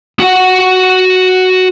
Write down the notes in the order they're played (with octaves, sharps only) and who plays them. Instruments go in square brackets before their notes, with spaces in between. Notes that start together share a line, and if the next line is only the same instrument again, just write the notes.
[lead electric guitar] F#4 F#5